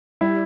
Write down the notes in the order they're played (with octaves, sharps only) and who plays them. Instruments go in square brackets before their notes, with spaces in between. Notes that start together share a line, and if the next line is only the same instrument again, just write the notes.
[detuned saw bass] G3 [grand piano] E4